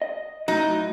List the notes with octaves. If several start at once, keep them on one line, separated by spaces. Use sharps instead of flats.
D#5
A2 F#3 D#4